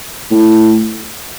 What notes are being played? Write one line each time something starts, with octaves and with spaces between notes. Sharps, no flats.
A2